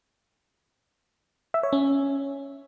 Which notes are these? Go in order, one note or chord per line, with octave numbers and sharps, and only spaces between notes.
E5
C#5
C#4